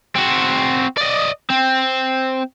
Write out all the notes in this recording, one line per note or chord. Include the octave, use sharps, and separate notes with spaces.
C4 F#4
D5 D#5
C4